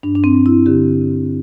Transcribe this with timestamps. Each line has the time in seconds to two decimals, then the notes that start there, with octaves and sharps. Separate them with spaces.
0.03 G2 D4
0.15 D4
0.24 C4
0.34 G2
0.46 E4
0.66 D3 G4